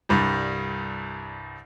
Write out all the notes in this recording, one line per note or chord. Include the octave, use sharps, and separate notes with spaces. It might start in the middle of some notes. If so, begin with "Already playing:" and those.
C2 G2 G3